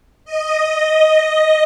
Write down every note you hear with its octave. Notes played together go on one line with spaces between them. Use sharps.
D#5